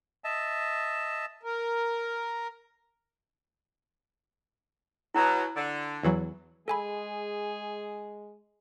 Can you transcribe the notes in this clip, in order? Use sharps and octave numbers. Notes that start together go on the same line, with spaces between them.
D#5 E5 A5
A#4
B2 F#3 E4 A#5
D3
E2 E3 F#3
G#3 G#4 A4 G#5 B5